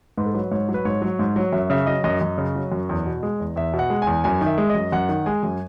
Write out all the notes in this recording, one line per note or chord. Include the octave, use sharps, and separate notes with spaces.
G#2 B4
A4
F#3 B4
G#2 C#5
F#3
B4
G#2 C#5
F#3
G#2
F#3
F#2 E5
C#3 E5
F#3 D#5
F#2 D#5
F#2 D#5
C#3
F#3
F#2
E2
B2
G#3
E2
E2 E5
B2
F#5
G#3
E2 G#5
F#2 G#5
D#3
E5
G#3
D#5
F#2
F#2 F#5
D#3
G#3 G#5
F#2